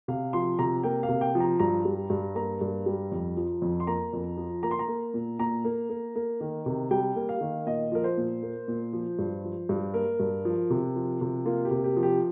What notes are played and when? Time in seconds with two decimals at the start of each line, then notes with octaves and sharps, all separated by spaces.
0.08 C3 F5
0.33 F3 C6
0.59 C3 A#5
0.83 A#3 G5
1.03 F5
1.09 C3
1.21 G5
1.35 F3
1.40 A#5
1.59 G2 A#5
1.85 G3
2.10 G2
2.35 A#3 A#5
2.61 G2
2.86 G3
3.12 F2
3.37 F3
3.62 F2
3.80 C6
3.87 A#3 A#5
4.13 F2
4.37 F3
4.63 A#3 A#5
4.71 C6
4.79 A#5
4.88 A#3
5.14 A#2
5.39 A#2 A#5
5.65 A#3
5.90 A#3
6.16 A#3
6.41 D#3
6.66 C3
6.91 G3 G5
7.16 A#3
7.29 F5
7.41 D#3
7.66 A#2 D#5
7.92 F3 A#4
8.04 C5
8.17 A#2
8.43 A#3
8.68 A#2
8.93 F3
9.19 G2
9.44 F3
9.69 G2
9.94 A#3 A#4
10.20 G2
10.45 F3
10.70 C3
10.96 F3
11.21 C3
11.45 A#3 F4
11.65 G4
11.71 C3
11.84 G4
11.96 F3
12.03 G4